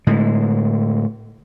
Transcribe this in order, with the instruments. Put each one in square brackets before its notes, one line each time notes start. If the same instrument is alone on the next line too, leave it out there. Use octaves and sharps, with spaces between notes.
[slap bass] A2 D3 G#3